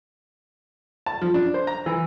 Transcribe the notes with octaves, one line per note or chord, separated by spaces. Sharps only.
A5
F3
D4
C5
A#5
E3